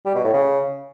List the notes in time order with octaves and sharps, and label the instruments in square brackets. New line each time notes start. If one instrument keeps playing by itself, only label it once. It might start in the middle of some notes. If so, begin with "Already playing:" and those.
[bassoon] G3
B2
A2
C#3